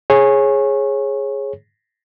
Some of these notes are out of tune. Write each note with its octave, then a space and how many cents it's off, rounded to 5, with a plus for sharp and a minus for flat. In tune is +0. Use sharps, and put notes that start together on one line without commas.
G#4 +0 C#5 -20